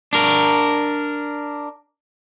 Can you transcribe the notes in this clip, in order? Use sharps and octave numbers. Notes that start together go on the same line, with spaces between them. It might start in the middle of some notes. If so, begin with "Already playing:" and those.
D4 A#4